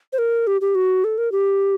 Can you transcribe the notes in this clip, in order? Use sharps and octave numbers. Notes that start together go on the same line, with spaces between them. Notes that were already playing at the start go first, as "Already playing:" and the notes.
C5
A#4
G4
G4
F#4
A4
A#4
G4